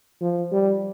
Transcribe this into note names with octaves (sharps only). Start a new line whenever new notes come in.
F3
G3